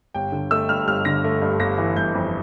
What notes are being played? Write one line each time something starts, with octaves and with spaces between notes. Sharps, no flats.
G1 G5
D3
A3 E6
G2 F6
G1 F6
D3 A#6
A3
G2
G1 A#6
E3
G1 G6
F2